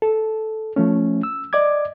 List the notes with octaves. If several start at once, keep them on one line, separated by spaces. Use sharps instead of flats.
A4
F3 A3 C#4
E6
D5 D#5 D6 G#6